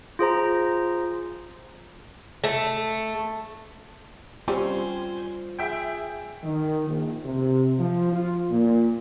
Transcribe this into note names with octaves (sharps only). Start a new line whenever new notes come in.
F4 G#4 C5 A#5
A3
G3 C4 C#4 F4 C5 G#5
G#4 E5 G5
D#3
A#1
C3
F3
F4
A#2